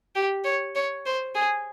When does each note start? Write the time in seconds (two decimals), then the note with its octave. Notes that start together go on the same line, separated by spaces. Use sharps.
0.16 G4
0.45 C#5
0.75 C#5
1.06 C5
1.35 G#4